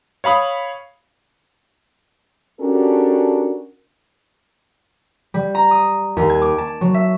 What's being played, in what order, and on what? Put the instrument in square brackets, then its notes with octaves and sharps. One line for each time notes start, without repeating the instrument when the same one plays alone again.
[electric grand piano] C#5 F5 B5 D#6
[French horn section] C#4 D4 F#4 G4 A4 A#4
[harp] G3
A#5
D#6
D#2
G#6
D6
A5
F#3
E5